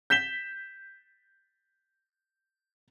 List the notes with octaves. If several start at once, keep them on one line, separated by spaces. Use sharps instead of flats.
G6 B6 E7 G7